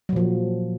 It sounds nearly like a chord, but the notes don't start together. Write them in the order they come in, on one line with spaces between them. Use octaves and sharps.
F#3 A#2 F3